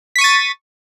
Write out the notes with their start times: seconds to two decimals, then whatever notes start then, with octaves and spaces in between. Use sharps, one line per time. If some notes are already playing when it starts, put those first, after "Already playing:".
0.16 B6
0.18 C#6
0.21 D#7
0.24 A6